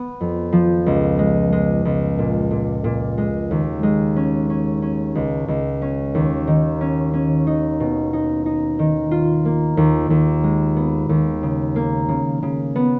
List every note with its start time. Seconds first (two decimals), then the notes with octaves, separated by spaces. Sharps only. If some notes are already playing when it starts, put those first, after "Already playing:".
Already playing: B3
0.21 F2
0.53 F3
0.86 C#2
1.19 G#3
1.52 G#3
1.85 C#2
2.19 A#2
2.51 A#2
2.84 A#2
3.18 G#3
3.51 D#2
3.83 G#3
4.16 C#4
4.50 C#4
4.82 C#4
5.15 C#2
5.48 C#2
5.82 C#4
6.15 D#2
6.47 D#3
6.81 C#4
7.14 C#4
7.47 D#4
7.80 B2
8.13 D#4
8.46 D#4
8.79 D#3
9.11 F4
9.45 A#3
9.77 D#2
10.10 D#2
10.44 G#3
10.76 B3
11.09 D#2
11.43 C#3
11.76 A#3
12.09 C#3
12.43 C#3
12.76 B3